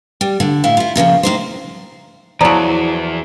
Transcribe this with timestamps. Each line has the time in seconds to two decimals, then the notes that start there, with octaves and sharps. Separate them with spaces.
0.21 G3
0.40 D3
0.64 A2 E4 F5
0.77 E4 F4
0.96 A#2 C#3 E3 F3
1.23 A2 D#4 C5
2.41 E2 F3 F#3 E4 D5 A#5